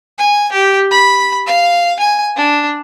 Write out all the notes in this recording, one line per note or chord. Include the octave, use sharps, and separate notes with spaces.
G#5
G4
B5
F5
G#5
D4